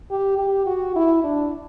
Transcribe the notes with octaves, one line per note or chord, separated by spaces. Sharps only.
G4
G4
F#4
E4
D4